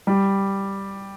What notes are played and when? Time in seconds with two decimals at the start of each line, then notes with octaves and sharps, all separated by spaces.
0.07 G3